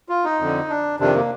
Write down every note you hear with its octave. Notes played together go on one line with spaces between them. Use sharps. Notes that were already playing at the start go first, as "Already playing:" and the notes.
F4
D#4
F2 D3
D4
F2 C3 D#3 D4
A#3